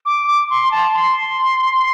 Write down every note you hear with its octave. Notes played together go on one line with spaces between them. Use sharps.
D6
D6
C6
A5
C6